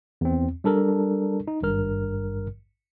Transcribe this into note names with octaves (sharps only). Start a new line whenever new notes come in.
E2 C4
G3 D4 A4 A#4
D#4
G#1 G2 A#4 F6